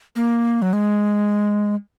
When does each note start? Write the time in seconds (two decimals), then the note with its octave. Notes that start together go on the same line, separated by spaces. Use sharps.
0.16 A#3
0.62 F#3
0.73 G#3